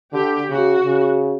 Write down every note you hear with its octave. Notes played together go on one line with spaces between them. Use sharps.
D3 G4
C#3 F#4
C#3